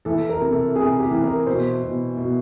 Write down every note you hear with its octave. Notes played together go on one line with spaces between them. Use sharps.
E3 A4
A#4
C3
A4
C3 G#4
G4
E3
A#4
B2 C5
B2
B2